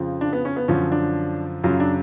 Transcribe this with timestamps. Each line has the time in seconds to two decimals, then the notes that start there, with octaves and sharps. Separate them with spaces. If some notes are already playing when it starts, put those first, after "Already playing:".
Already playing: F2 C#3 F3
0.21 D4
0.32 B3
0.45 C#4
0.56 B3
0.68 F#2 D3 F3 C#4
0.92 D4
1.64 F#2 C#3 F#3 F4
1.80 D4